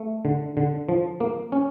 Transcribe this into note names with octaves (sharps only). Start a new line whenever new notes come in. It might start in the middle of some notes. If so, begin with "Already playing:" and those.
Already playing: A3
D3
D3
F3
A#3
C#4